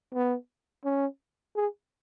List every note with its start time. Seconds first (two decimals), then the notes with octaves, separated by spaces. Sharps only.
0.14 B3
0.85 C#4
1.56 G#4